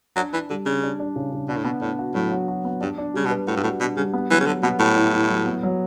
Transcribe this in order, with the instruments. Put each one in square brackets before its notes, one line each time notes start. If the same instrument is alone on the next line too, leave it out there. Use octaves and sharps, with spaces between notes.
[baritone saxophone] F#3 [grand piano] D4
[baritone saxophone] E3 [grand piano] D4
[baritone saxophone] D3 [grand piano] G3
[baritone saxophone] C#3 [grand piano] D4
[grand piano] D4
D4
C#3
C#3
[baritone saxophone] B2 [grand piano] D4
[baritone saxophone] A2
[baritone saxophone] B2 [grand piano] B3
[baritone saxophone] A2 [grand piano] D4
[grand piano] F#4
[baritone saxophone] A2 [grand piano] F#3
[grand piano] F#4
F#4
B3
[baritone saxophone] G2 [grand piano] D4
[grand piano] D4
[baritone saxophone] C#3 [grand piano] G3
[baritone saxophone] B2
[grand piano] B4
[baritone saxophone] A2 [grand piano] F#4
[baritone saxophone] G2
[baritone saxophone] A2 [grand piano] F#4
[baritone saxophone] B2 [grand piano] D4
[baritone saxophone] C#3 [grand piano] G3
[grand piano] B3
[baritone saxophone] E3 [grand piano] F#3
[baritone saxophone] C#3
[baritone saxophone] D3 [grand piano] F#3
[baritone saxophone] B2 [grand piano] B3
[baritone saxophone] A2 [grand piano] G4
[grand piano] E4
E4
F#3
B3
F#3